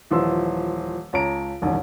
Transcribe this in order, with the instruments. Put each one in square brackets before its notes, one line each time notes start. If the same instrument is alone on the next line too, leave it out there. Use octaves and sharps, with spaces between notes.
[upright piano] D#1 E3 F3 C6 E6
C#2 C#5 A5 A#5 D7
E1 C2 F#2 D#3